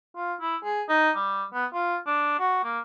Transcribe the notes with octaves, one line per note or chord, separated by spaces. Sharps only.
F4
E4
G#4
D#4
G3
B3
F4
D4
F#4
A#3